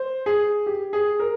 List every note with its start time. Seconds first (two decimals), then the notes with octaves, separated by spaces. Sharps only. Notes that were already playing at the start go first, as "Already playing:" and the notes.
Already playing: C5
0.26 G#4
0.66 G4
0.93 G#4
1.19 A#4